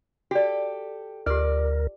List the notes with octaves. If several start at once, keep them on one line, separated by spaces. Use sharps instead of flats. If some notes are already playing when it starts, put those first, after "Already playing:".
F#4 G4 A4 D5
D2 F4 G4 A#4 D5